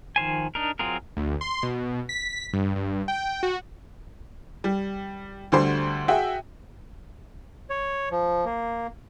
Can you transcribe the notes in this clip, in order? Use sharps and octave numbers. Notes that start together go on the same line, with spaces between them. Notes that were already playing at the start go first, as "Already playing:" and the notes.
D#3 F3 C5 G#5
D4 D#4 A#4
F#3 C4 F4 G#4 A#4
D2
C6
B2
B6
G2
G2
G5
F#4
G3
D2 D3 G3 C5 C6
F#4 G#4 E5 G5
C#5
F3
A#3